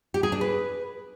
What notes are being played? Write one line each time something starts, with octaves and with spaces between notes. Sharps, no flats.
G4
G#4
D4
B4